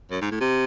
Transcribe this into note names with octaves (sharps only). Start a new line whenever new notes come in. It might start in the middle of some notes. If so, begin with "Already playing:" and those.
F#2
G#2
A2
C3